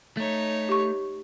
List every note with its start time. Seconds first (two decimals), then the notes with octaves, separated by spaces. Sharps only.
0.17 A3 D#4 C#5
0.69 G4 C#6